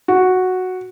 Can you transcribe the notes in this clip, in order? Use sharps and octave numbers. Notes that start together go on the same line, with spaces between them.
F#4